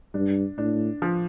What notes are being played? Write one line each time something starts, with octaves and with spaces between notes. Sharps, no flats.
G2 D4
A2 D4
F3